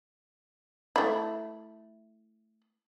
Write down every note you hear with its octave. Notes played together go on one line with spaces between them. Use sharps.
A3 E4